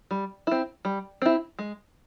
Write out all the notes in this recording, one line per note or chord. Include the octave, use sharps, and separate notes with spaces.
G3
C4 E4
G3
C4 E4
G#3